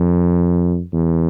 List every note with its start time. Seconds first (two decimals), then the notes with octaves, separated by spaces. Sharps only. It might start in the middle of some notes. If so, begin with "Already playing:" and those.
Already playing: F2
0.94 E2